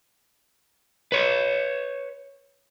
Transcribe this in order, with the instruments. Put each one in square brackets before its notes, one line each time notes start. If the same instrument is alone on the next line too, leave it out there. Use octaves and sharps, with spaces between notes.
[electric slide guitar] B4 C#5